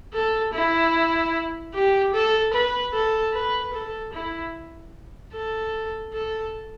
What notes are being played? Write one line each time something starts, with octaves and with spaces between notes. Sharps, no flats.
A4
E4
G4
A4
B4
A4
B4
A4
E4
A4
A4